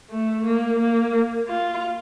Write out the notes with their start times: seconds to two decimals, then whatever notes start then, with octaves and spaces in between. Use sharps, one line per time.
0.11 A3
0.45 A#3
0.80 A#3
1.48 F4